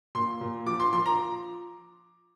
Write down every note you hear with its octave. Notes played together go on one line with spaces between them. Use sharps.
A#2 C6
A#2
F3 D6
C6
F3 C6
A#5